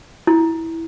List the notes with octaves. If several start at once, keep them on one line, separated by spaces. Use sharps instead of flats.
E4